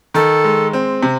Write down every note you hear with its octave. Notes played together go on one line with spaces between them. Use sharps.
D#3 A4
G#3
C4
C3